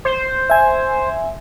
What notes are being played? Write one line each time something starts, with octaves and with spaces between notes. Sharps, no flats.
C5
E5 G#5